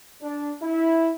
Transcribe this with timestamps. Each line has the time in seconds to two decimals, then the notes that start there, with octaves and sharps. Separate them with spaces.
0.21 D4
0.62 E4